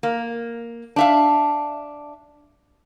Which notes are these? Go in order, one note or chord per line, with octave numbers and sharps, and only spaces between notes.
A#3
D4 E5 F5